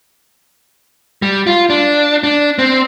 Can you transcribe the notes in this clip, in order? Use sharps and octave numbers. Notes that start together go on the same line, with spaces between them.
G3
F4
D4
D4
C4